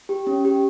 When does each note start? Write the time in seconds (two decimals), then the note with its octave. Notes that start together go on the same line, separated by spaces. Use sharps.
0.09 G4
0.27 C#4
0.45 G4